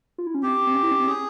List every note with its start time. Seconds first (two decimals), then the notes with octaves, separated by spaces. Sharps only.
0.18 F4
0.27 E4
0.35 C#4
0.42 C4 G4
0.67 C4
0.75 C#4
0.83 E4
0.91 C#4
1.00 C4
1.07 C#4 G#4